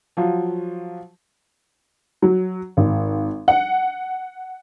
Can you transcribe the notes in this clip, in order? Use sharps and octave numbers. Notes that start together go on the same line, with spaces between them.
F3 F#3 F4
F#3
G#1
F#5